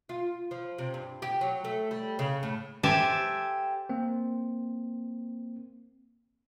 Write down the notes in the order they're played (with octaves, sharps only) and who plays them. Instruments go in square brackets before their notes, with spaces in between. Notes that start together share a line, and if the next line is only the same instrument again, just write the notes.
[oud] F4
F3
C3
G2
G4
F#3
A3
G3
C#3
A2
[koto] G4 A4 C5 E5 G#5 A5
[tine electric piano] A#3 C4